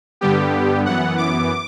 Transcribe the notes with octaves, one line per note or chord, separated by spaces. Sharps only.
G2 D3 G3 B3 G4
F#2 E3 B3 F#5
D6